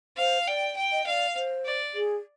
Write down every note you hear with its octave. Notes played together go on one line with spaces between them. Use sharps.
C5 F5
D5 G5
G5
D#5
D5 D#5 F5
C5
D5
G#4